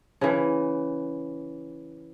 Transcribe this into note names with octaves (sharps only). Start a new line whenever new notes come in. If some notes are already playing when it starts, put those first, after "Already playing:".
C#3 E3